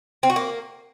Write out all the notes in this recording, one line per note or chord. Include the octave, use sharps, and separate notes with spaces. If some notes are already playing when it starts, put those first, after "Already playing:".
C4
F#4
A#3